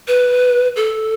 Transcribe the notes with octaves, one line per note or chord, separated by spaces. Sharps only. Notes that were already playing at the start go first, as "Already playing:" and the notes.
B4
A4